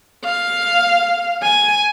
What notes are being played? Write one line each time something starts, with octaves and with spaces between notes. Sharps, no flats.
F5
G#5